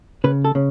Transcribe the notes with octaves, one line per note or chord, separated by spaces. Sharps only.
C#3 B4
A4
C#3